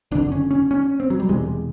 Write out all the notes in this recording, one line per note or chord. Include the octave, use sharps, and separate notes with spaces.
F#1 F2 D3 D4
C#4
C#4
C#4
C4
F#3
G3
E1 E2 C3 G#3